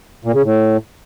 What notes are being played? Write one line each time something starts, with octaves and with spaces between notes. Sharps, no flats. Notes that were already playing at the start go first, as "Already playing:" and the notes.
A#2
C#3
A2